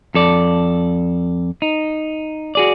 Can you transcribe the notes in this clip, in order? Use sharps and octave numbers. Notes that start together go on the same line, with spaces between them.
F2 A4 D5
D#4
F#4 G#4 D5